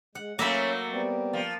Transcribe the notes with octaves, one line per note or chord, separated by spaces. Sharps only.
G#3 F#5
F#3 A3 A#3 C#4 C#5 E5 F5 B5
G3 B3 C4
F3